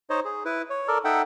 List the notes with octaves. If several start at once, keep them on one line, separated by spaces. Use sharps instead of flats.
D#4 C5 C#5 D#5
G#4
E4 B4
C#5
A4 A#4 D5
D#4 A4 E5 F#5 G5